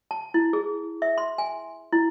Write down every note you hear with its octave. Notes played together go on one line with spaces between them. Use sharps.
A5
E4
G#4
E5
C6
G#5
E4